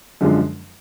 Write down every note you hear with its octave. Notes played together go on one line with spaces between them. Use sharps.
F#2 D3 F3 G#3